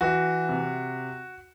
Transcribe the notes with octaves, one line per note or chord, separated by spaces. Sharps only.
E3 F#4
C3